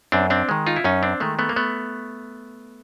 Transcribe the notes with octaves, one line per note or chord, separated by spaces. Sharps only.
F#2 C4 D4
C4 D4
D#3 G#3
D#4 F4
E4
F#2 C#4 D#4
C4 D4
D#3 G#3 A3
A3 B3
A#3
A3 B3